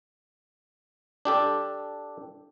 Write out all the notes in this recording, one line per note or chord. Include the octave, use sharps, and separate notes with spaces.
D4 G4 A4